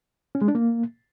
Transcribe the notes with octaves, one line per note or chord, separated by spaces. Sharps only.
C#4
G#3
D4
A#3